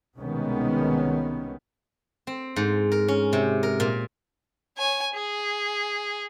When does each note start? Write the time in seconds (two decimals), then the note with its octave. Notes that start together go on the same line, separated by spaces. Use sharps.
0.17 C2 B2 D#3 G#3 B3 C#4
2.27 C4
2.56 G#2
2.92 A#4
3.08 C#4
3.33 C3
3.63 A#4
3.80 A#2
4.78 C#5 G#5
5.14 G#4